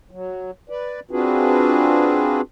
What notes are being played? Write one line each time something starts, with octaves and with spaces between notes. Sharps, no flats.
F#3
B4 D5
C4 D4 F4 F#4 G#4 B4